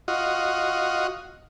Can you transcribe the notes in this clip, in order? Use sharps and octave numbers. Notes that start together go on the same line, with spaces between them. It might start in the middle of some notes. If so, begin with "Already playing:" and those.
F4 F#4 D#5